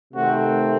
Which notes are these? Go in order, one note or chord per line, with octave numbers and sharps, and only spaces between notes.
C3 D#3 A3 C4 F#4